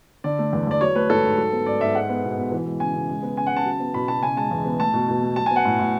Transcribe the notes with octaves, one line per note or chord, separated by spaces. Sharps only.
D3 D5
A3
E2
E2 D5
F#3 C#5
A3 B4
G#2 A4
G#2
F#3
B3
G#2 D5
G#2 E5
G#3 F#5
B3
B2
B2
E3
G#3
C#3 G#5
C#3
G#3
B3
C#3 G#5
F#5
C#3 A5
F#3
B3
B2 B5
B2 A5
C#3 G#5
G#3 A5
E2
B3
A3 A5
B2
B2
A3
F#3 A5
B3 G#5
F#5
A2
A2